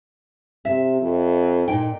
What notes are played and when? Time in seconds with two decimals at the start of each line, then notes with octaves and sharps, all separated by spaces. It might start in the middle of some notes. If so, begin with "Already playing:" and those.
0.65 C3 E5
1.01 F2
1.68 A#2 D#4 G5